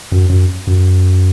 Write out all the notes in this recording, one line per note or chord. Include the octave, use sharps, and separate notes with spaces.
F#2
F#2
F#2